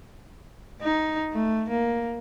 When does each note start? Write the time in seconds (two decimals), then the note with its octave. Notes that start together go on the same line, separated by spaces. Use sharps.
0.82 D#4
1.33 A3
1.71 A#3